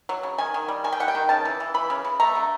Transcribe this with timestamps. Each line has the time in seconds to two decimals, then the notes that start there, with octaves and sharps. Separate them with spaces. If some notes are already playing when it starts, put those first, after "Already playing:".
0.09 F#3
0.23 C#3
0.38 D#3 G#5
0.54 D#3
0.68 G3
0.84 D#3 G#5
0.92 G5
1.00 G3 F#5
1.08 G5
1.15 D#3
1.29 C#3 A5
1.45 E3
1.60 E3
1.74 E3 B5
1.90 C#3
2.04 C#3
2.20 A3 A#5
2.35 D3